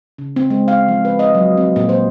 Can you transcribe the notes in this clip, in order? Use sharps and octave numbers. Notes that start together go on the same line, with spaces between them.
C#3
C4
G#3
F5
F3
B4
D#5
F#3
C4
A#2
C5